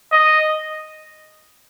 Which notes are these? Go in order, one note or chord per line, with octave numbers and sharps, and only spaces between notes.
D#5